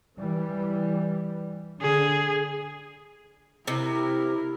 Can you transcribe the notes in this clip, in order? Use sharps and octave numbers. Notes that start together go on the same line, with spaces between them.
E3 G3
D3 G#4
C3 E4 A#4